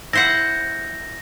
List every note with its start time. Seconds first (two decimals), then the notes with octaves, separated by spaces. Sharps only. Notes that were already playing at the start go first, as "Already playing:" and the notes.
0.13 E4 C5 F#5 A#6